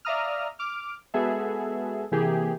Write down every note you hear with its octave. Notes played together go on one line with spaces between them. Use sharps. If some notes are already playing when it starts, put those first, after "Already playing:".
D5 E5 F5 A#5 D#6 F6
D6 F6
G#3 B3 F#4 G#4 A4 E5
C3 E3 A#3 G4 G#4